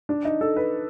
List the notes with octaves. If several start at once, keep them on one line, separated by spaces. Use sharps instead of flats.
D4
D#4
A4
B4